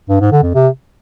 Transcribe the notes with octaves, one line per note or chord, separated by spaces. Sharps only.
G2
G#2
D3
F2
C3